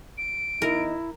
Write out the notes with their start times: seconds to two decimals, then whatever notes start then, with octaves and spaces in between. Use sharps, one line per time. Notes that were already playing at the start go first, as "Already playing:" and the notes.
0.17 D7
0.62 E2 D#4 E4 A#4